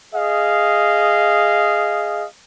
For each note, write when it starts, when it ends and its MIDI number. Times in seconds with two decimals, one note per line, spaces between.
0.14 2.26 68
0.14 2.26 75
0.14 2.26 77